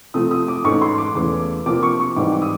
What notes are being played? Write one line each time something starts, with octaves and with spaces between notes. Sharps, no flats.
C3 F3 A3 C4 D#6
D#6
D6
G#2 E3 A3 C#4 C#6
C6
D6
E2 C#3 E3 A3 D6
C3 F3 A#3 D4 D6
C#6
C#6
G#2 E3 G3 C4 D6
D6
D#6